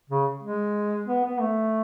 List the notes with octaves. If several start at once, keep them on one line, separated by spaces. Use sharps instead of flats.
C#3
G#3
B3
B3
A3